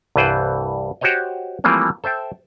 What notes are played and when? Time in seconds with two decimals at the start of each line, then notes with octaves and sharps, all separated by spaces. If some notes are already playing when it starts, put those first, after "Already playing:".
0.16 C2 G2 E3 B4 C5 D5
1.01 F#4 G4 C5 C#5 D#5
1.64 E3 F3 G3 A3 A#3 C4
2.04 A4 C5 E5 G5